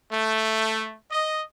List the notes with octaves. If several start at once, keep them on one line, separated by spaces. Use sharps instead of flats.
A3
D#5